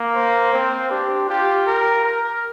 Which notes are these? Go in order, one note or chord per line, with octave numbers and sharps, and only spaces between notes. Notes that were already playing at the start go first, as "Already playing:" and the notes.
Already playing: A#3
C5
C4 C5
D4 G4
F4 G4
A#4
A#4